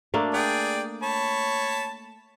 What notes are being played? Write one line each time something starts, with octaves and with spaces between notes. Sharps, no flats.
A3 A#3 D4
G#4 D5 G5
C#5 A5 B5